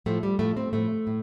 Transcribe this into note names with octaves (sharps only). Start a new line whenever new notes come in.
A2 F3 A3
G3
A2 F3 A3
C4
A2 F3 A3
A2